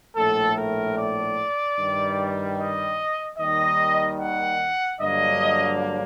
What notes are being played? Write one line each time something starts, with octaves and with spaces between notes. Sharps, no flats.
A#1 A2 A3 A4
A#4
D5
G2 D#3 G3
D#5
D#2 D#3 G3 D#5
F#5
G2 D3 F#3 A#3 D#5